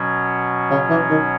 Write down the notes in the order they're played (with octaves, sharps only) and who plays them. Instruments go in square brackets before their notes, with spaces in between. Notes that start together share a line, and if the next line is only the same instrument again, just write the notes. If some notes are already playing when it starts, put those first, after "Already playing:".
Already playing: [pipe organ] B2 F#3 C#4
[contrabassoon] C#3
E3
D#3